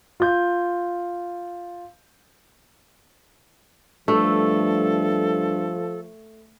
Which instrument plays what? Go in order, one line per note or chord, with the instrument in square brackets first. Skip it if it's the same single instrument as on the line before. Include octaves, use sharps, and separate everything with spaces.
[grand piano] F4 G6
[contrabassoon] G2 [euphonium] F3 [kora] A3 [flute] A4